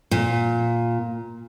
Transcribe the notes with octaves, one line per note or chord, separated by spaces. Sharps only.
A#2